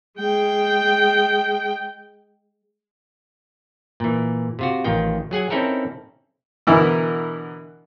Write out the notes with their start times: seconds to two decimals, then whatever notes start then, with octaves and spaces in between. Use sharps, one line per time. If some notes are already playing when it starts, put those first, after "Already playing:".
0.18 G#3 G5
4.00 A#2 E3
4.59 C3 F4 F#4
4.84 A1 D#3 F4 G5
5.31 F#3 G#4 F#5 G#5
5.50 C4 C#4 D#4 E4 A4 A#4
6.67 B2 D3 E3 E4 A#4